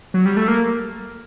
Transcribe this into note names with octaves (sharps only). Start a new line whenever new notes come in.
F#3
G3
A3
A#3